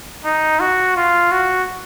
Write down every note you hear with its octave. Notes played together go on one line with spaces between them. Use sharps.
D#4
F#4
F4
F#4